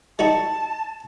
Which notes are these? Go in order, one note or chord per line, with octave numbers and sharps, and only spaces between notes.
G3 D#4 F#4 A5